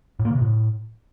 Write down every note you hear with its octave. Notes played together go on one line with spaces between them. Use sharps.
A2
A#3
C#3
C3
A2